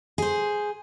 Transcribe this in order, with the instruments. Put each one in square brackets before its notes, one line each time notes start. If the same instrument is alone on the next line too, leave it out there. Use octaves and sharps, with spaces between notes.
[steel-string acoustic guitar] G#4 C5